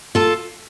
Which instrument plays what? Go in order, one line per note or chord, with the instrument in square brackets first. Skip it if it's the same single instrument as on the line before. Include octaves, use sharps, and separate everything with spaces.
[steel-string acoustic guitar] F4 A4